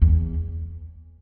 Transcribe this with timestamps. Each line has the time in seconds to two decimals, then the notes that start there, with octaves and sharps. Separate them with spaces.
0.02 E2